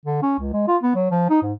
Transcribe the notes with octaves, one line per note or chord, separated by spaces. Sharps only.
D3
C#4
C#2
G#3
F4
B3
F#3
F3
D#4
G#2